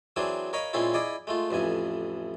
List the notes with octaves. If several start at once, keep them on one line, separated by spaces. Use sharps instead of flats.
E3 F#3 C4 D4 G#4
A#4 C#5 D#5 F5 B5
A#2 G#3 C4 C#4 E4 F4
E4 G#4 D5 D#5
G#3 A3 F4
A1 F2 E3 G#5